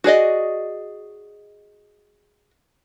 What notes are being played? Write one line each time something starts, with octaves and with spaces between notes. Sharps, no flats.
F#4 G#4 D5 D#5